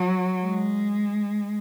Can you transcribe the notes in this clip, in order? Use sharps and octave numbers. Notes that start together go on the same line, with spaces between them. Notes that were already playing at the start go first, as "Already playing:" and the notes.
Already playing: F#3
G#3